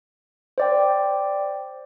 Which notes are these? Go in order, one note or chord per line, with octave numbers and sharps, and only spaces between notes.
C5 D5 G5